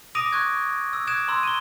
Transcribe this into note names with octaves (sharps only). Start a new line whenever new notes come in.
D6 D#6 A#6 D7 D#7 F7
C#6 F#6 G#6
E6
D6 D#6 F#6 G#6 D7 E7
A#5 C6 E6
D#7 G7